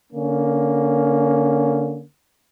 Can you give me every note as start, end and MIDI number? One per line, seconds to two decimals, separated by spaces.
0.12 2.02 50
0.12 2.02 58
0.12 2.02 61